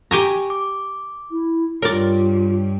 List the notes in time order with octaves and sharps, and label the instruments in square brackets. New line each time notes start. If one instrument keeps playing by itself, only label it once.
[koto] G4 G#5 A#5 [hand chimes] C#6
[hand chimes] D6
[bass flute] E4
[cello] G2 G3 [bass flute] F4 [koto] A#4 D5 [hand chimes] C#5